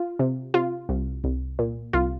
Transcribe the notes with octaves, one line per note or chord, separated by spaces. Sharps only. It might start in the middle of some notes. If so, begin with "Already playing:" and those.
Already playing: F4
C3
C3 F4
C2
C2
A#2
C2 F4